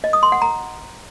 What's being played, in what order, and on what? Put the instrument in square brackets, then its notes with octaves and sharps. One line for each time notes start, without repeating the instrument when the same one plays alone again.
[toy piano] D#5
D#6
C6
F#5
A#5